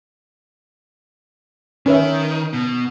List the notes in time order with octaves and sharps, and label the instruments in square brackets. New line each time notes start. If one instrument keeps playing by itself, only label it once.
[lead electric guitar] D#3 [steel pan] C#4 B4 E5
[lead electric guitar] B2